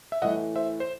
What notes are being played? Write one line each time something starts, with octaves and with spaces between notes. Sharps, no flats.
E5
A2 E3 A3 D#5 F#5
C5 E5
C5